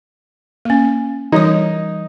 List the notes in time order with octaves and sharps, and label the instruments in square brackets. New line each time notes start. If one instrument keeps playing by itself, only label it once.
[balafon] A#3 C#4
[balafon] E3 G3 D#5 [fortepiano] D#4